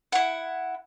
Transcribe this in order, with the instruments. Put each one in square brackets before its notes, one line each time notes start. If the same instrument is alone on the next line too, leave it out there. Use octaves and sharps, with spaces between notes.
[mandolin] E4 F#5